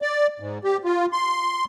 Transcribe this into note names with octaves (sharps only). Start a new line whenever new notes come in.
D5
G#2
G4
F4
C6